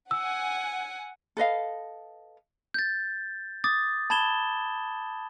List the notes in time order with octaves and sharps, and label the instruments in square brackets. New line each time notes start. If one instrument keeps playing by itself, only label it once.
[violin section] F#5 G#5 [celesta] E6
[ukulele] A4 B4 D#5 F5
[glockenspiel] G6 A6
D6 D#6 A6
A5 B5 G#6 E7 G7